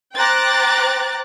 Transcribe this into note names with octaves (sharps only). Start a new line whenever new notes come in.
C5 G5 A#5 D6 F#6 A6